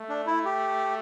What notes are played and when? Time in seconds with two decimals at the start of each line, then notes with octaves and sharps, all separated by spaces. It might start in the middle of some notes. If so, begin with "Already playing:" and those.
Already playing: A3
0.09 D4
0.27 E4
0.45 G4